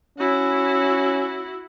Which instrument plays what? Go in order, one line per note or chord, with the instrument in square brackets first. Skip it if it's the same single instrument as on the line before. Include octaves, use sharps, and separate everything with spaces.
[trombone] C#4 [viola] E4 F#4